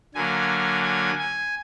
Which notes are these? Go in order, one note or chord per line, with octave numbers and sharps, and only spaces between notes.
D3 F#3 A#3 G#5
G#5
G#5